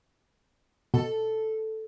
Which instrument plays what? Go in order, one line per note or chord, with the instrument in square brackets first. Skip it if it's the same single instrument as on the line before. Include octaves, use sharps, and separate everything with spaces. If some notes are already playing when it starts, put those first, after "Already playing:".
[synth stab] B2 [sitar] A4